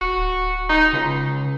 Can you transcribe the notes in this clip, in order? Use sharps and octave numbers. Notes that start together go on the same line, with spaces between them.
D#1 F#4
D1
D#4
C#2 C#3